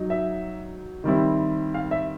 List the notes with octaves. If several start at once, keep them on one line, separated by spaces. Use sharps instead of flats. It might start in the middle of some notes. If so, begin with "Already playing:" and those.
Already playing: F#3 D#4
E5
D#3 G3 C4 E4
F5
E5